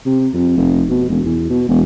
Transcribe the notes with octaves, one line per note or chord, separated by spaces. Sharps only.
C3
F2
F1
B2
E1
E2
B2
E1